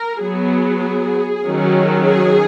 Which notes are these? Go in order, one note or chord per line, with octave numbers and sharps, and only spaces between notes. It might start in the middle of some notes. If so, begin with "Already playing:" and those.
Already playing: A#4
F#3 B3 G#4
D#3 F#3 C#4
G#4